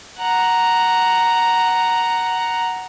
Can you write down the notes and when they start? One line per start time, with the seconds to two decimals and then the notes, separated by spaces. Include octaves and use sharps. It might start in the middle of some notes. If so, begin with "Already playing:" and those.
0.19 F#5 A#5